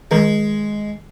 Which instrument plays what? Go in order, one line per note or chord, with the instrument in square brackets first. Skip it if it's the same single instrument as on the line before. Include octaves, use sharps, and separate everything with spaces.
[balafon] D#3 [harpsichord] G#3